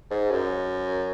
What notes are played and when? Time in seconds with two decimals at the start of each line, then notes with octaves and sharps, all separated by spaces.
0.11 G#2
0.31 F#2